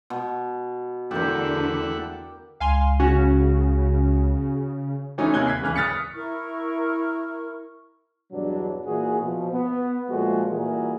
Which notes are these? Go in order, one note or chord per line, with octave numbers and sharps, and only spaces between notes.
B2
E2 D3 A3 E4 G4 A#4 F#5
C#2 F5 G#5 C6
C#3 C#4 F#4
E3 A3 C#4 D#4
D#2 C3 G#5 F#6 G#6 G7
G#6 B6 C7
D1 C#3 E3 F6 F#6
D#6 F6 A6 B6 C#7
E4 A#4 C#6 F6
E2 G2 B2 F#3 D4
A#2 E3 F#4 G#4
B2 F3
B3
A#2 F3 G#3 A3 F4 F#4
A#2 E3 G3 F#4 G#4 A#4